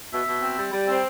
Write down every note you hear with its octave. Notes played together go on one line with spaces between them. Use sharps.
B2 E5
B2
C4
G3
G3
C4